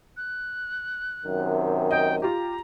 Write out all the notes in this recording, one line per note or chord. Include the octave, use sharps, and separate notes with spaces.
F#6
F#2 C3 D#3
D#5 G5
F4 G4 A#5